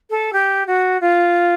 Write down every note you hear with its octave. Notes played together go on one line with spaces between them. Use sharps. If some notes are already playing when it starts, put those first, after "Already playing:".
A4
G4
F#4
F4